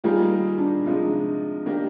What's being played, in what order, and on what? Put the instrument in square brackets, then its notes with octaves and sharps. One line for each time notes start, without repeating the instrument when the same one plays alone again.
[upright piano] D#3 G3 A#3 D#4 G#4 [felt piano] F4
[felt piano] D4
[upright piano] C3 F3 G#3 D#4
D#3 A#3 D4 G4